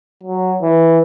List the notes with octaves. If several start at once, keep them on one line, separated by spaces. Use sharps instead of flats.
F#3
E3